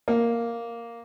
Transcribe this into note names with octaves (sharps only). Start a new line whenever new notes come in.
A#3